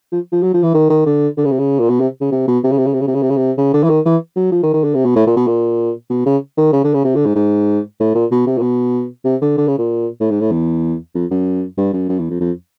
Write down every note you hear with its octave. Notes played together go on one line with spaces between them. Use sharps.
F3
F3
F#3
F3
E3
D#3
D#3
D3
D3
C#3
C3
C#3
A#2
B2
C3
C#3
C3
B2
C3
C#3
C3
C#3
C3
C#3
C3
C#3
C3
C#3
C3
C#3
D3
E3
D#3
E3
F#3
F3
D#3
D#3
D3
C3
B2
A2
A#2
B2
A#2
B2
C#3
D#3
C#3
D3
C#3
C3
D3
G#2
G#2
A2
A#2
B2
C3
A#2
B2
C3
D3
D3
C#3
A#2
A2
G#2
A2
E2
F2
F#2
G2
F#2
F#2
E2
F2
F2